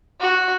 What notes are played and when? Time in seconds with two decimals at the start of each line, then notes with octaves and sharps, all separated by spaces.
0.20 F#4